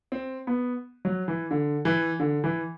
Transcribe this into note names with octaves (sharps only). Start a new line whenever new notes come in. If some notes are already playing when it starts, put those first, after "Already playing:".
C4
B3
F#3
E3
D3
E3
D3
E3